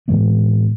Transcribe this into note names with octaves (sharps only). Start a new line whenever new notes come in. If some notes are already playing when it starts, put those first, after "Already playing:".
A2 E3 G#3 B3